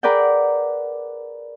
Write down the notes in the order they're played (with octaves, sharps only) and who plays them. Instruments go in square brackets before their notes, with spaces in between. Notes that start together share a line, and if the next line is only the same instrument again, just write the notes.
[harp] G#4 A#4 B4 D5 F#5 G5